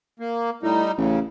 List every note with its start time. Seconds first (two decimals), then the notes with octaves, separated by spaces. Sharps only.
0.20 A#3
0.63 A2 G3 D#4
0.98 A1 C#3